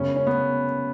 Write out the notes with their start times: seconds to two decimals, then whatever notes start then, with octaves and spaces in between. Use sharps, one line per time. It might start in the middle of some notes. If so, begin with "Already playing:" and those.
Already playing: F#2 C#3 G#3 B3 C#4
0.16 C#4
0.27 B3